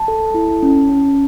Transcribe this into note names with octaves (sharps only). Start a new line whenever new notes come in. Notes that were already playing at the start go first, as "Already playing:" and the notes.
Already playing: A5
A4
E4
C#4
C#4